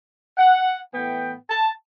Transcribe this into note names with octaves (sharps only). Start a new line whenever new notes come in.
F#5
A2 E3 B3 G5
A5